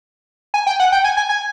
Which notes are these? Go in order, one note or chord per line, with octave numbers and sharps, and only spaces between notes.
G#5
G5
F#5
G5
G#5
G#5
G#5